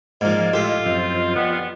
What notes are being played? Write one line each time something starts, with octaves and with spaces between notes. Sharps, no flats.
G#2 F3 A#3 D5 D#5 F5 G#5
A2 E4 F4 G4 A4
F#2 F3 C4 D#5
F3 G3 B3 F4